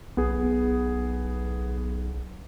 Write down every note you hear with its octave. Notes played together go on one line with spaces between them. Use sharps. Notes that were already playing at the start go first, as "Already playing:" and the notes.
B1 B3 G#4